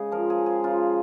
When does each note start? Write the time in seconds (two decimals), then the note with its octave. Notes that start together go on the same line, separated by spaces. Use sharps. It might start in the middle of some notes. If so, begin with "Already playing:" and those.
Already playing: G#2 C#3 G#4
0.11 F3 A#4
0.30 G#4
0.39 G#3
0.46 G#4
0.64 C#3 F4